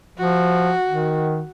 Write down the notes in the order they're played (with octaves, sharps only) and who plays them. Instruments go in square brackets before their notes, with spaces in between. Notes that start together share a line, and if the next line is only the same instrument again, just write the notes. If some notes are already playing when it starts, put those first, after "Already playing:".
[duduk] F3 [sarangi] F#4
[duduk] D#3